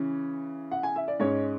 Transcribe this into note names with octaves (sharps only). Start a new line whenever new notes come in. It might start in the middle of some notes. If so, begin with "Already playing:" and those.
Already playing: C#3 E3 C#4
F#5
G#5
E5
D5
G#2 G#3 C#4 C#5